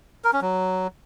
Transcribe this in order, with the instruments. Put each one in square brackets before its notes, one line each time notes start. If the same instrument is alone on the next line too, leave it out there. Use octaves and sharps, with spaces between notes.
[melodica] A#4
C#4
F#3